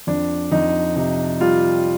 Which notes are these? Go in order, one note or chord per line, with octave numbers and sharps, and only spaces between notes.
F2 D4
F2 D#4
C3 D#4
G3 F4